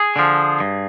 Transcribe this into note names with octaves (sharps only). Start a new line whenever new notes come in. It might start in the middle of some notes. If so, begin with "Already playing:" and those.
Already playing: G#4
D3 F3
G2